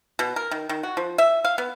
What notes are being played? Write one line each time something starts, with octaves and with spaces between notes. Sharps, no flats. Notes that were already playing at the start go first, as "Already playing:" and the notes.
B2
A#4
D#3
D#3
F#4
F3
E5
F5
B3